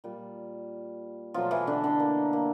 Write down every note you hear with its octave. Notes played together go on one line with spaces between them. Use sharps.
A#2 G3
B2 F3 F#3 A3 F4
E3 E4
D3 D4
D3 D4
A#3
A#3